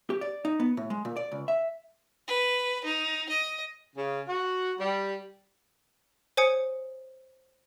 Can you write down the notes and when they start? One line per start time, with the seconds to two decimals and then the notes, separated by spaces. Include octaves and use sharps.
0.10 G4
0.21 D5
0.45 D#4
0.60 B3
0.77 A2
0.90 G#3
1.05 A#2
1.17 D5
1.32 C#2
1.48 E5
2.27 B4
2.84 D#4
3.29 D#5
3.95 C#3
4.28 F#4
4.78 G3
6.37 C5 C#5 G#5 D#6 C#7